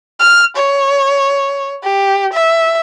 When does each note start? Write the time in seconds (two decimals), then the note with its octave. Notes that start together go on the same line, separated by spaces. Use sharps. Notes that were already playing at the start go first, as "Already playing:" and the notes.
0.20 F6
0.57 C#5
1.83 G4
2.33 E5